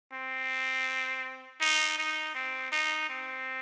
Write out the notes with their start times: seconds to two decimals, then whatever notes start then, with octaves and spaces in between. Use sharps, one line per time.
0.13 C4
1.61 D#4
1.98 D#4
2.35 C4
2.72 D#4
3.09 C4